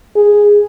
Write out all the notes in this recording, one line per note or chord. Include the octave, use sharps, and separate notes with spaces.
G#4